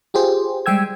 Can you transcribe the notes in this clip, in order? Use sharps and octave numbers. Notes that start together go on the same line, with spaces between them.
F4 G4 G#4 C5
G3 G#3 G5 E6 G#6